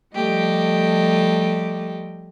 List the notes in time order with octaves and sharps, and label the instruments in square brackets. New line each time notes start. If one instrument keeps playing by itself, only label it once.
[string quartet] F3 G3 A3 G4 D#5